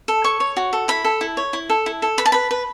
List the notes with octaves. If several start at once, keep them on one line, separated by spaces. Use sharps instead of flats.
A4
C#5 C#6
C#5
F#4
A4
E4 B5
A4
E4
C#5
E4
A4
E4
A4
B4 B5
A5
B4 B5
B4